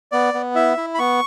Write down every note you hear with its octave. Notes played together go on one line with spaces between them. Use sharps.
B3 D5
B3
E4 E5
E4
B5
B3 C#6